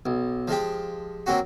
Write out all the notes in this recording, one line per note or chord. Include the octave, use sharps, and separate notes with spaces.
B1
F3 G#3 G4
F#3 A#3 C4 F#4